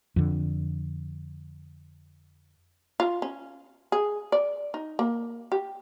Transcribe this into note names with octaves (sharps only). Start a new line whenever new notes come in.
F2 D3
F4
C#4
G#4
D5
D#4
A#3
G4